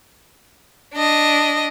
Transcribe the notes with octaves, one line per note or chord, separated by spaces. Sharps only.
D4 D#5